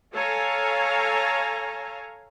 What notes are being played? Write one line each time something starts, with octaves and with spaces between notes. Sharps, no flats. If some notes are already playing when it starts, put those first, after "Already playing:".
A4 C#5 F5 G#5 A#5